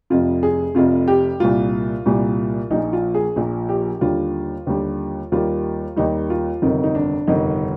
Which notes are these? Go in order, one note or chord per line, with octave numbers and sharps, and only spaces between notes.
F1 F2 C3 F4
G#4
F1 F2 C3 F4
G4
C2 A#2 G3 F4
C2 A#2 G3
A#1 A#2 F3 D#4
F4
G#4
A#1 A#2 F3
G4
D#2 D3 G3 F4
D#2 D3 G3
D#2 D#3 G3 F4
D#2 D#3 G3 D#4
F4
G1 F2 C3 D#3 D#4
D#4
D4
G1 F2 C3 D#3 D#4